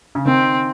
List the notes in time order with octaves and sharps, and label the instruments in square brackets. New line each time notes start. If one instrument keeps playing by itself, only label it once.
[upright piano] C#3
[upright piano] D#3 [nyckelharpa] C4